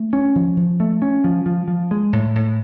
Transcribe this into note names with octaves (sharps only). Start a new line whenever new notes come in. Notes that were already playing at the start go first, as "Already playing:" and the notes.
Already playing: A3
C#4
F3
F3
A3
C#4
F3
F3
F3
G#3
A2
A2